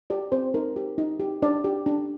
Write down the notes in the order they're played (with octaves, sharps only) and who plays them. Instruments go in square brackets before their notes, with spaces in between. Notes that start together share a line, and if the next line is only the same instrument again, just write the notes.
[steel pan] G4 D5
C4 C5
D#4 A#4
G4
D#4
G4
D4 D5
G4
D4